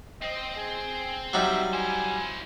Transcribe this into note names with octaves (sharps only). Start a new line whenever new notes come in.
C4 D#5
G#4
F#3 G3 D#4 E5
E4 C5 G#5